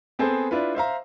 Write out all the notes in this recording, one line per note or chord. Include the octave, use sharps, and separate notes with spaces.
B3 C4 G#4 A4 C5
D4 E4 F4 B4
C5 E5 F5 A#5